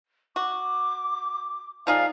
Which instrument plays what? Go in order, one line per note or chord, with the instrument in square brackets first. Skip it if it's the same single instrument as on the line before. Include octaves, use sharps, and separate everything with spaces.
[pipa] F#4 [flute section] D6
[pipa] F3 D#4 G#4 [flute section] D5 F5